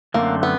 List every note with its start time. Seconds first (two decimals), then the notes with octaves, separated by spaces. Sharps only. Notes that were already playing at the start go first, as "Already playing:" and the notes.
0.14 F#2 D3 F#3 A3 A#3 C4
0.43 B3